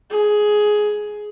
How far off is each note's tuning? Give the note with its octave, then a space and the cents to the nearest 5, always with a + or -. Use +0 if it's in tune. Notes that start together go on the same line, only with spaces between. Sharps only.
G#4 +10